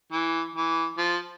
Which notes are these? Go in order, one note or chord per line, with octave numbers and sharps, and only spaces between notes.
E3
E3
F3